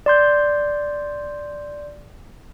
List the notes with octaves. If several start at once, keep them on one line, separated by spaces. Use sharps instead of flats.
D5 C6 G6